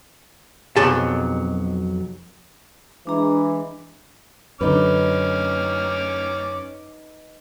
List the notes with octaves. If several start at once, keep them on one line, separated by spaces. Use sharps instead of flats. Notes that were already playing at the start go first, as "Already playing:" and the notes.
B1 F2 F#3 G#4 A5
E3 G#3 D4 A#5
F#2 D3 C#4 D#4 B4 D6 F6